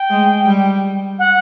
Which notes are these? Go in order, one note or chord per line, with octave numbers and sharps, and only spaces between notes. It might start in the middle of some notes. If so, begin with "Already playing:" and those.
Already playing: G5
G#3
G3
F#5